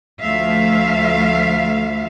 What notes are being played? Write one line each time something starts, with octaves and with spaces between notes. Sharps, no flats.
D2 F3 A3 E5 F5